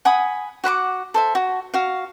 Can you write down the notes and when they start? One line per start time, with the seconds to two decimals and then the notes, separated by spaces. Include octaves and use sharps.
0.05 F#5 G#5 B5 D#6
0.64 F#4 F#5 B5 D6
1.14 A4 C5 E5
1.35 F#4
1.74 F#4 F5